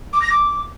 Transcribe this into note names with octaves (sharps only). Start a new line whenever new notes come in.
D6
A#6
D6